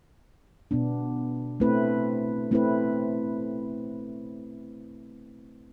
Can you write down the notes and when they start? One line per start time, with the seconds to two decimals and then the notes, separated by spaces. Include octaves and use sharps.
0.71 B2 B3 D4
1.60 A3 C4 E4 B4
2.51 A3 C4 E4 B4